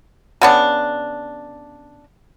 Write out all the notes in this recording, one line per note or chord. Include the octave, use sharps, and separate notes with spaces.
C#3 B3 D4